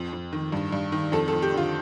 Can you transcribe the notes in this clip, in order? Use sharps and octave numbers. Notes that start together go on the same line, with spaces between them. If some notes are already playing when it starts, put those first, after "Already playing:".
Already playing: F2
F2
D#3
G2
G2
D#3
F2 A4
A4
F2
G4
D3 F4